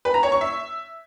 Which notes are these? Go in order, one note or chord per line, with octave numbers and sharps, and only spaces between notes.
B4
A#5
C#5
C#6
E5